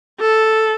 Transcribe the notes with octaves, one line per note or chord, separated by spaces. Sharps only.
A4